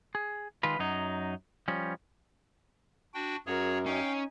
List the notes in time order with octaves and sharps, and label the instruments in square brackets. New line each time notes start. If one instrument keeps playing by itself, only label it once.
[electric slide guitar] G#4
D#3 G#3 F4 B4
F#2 F#3 D#4
F3 G3 C#4
[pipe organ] D4 F#4 G5
[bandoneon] F#2 [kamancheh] F#4 A#4 [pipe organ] G#4 C#5
[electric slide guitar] C#4 [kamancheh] D#4 G#5 [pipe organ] F5 G5